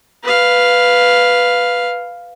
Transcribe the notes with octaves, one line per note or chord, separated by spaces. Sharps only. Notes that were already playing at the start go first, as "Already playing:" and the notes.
B4 F5